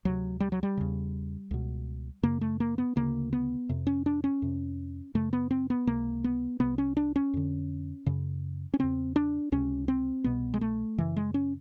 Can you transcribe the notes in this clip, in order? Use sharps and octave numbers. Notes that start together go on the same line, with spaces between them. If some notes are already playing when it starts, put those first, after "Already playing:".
D2 C3 F#3
G3
F#3
G3
E2 C#3
C#2 B2
F#2 C#3 A#3
A3
A#3
B3
D2 C#3 A#3
B3
F2 C3
C#4
D4
C#4
F2 C3
F#2 C#3 A3
B3
C4
B3
C#2 C3 A#3
B3
C2 C3 B3
C#4
D4
C#4
F2 D3
F#2 C#3
C#4
E2 C#3 C4
D4
C#2 C3 C#4
C4
C2 B2 B3
G#3
A3
F#2 C#3 E3
G#3
C#4